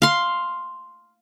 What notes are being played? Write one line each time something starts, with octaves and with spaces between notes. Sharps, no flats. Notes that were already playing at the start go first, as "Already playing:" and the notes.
F5 C6